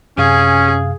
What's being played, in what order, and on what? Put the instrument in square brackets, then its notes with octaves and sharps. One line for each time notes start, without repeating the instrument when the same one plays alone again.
[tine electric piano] F#2 C3 F5 [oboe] C#4 [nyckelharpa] G#4